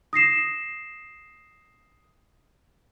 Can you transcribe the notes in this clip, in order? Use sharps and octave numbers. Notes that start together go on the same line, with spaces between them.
D#6 A#6 C7 E7